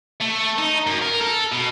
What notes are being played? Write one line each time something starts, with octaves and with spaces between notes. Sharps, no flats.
A3
D#4
F#2
A#4
A4
B2